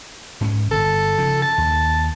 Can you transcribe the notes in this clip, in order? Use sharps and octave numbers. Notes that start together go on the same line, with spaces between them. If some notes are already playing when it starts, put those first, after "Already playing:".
G#2 C4 C#4
G1 A4
C#3 F3
A5
D#2